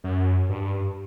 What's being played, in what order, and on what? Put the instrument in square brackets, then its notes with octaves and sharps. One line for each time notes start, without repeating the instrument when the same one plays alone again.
[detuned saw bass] F#2
G2